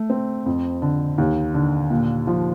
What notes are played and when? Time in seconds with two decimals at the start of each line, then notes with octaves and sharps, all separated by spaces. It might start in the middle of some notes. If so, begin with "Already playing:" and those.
Already playing: A3
0.10 C4
0.46 F2
0.82 D3
1.18 D#2
1.54 D3
1.90 A#2
2.27 F3